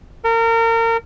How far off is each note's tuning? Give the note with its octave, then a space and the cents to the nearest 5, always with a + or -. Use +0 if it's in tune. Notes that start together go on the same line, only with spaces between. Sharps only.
A#4 -30